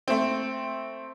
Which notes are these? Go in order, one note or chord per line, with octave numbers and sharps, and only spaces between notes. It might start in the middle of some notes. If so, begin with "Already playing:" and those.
A3 C4